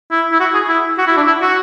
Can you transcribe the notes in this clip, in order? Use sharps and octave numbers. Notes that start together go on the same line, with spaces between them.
E4
E4
F#4
G#4
E4
F#4
E4
D4
E4
F#4